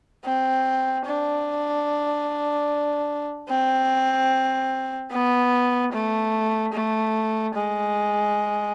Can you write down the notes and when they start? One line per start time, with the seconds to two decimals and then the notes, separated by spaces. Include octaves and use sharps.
0.25 C4
1.07 D4
3.49 C4
5.12 B3
5.93 A3
6.73 A3
7.55 G#3